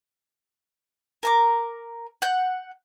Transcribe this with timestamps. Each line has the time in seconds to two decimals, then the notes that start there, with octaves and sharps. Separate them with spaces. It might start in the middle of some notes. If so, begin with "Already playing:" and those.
1.23 A#4 A#5 D6
2.22 F#5 G6